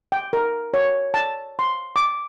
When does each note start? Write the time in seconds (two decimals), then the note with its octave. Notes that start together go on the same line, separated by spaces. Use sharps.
0.12 G5
0.33 A#4
0.74 C#5
1.14 A5
1.59 C6
1.96 D6